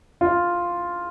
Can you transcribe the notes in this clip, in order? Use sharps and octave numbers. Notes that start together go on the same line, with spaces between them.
F4